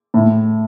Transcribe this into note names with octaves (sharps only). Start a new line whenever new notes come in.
A2